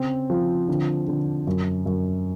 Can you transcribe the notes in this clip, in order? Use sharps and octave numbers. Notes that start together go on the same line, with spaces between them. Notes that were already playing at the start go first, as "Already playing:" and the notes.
Already playing: C#3 C4
F3
D3
D3
F#2
F#2